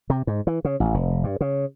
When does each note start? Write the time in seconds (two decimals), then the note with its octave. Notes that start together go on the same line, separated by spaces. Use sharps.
0.10 C3
0.27 G#2
0.47 E3
0.65 C#3
0.80 A1
0.94 F1
1.24 G2
1.41 C#3